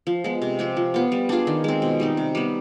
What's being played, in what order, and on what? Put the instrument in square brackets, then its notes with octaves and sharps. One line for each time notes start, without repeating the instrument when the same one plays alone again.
[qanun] F3
G#3 B3
C3
F3 C4 G4
F3
B3 F4
G3
D4 F4 G#4
D#3
G#3 C4
B2
G3 C4 D#4
C3
G3 B3